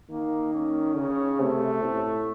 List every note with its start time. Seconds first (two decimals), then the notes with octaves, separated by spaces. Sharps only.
0.10 D#3 A#3
0.54 C#4
0.96 C#3
1.40 C3 A3
1.82 A2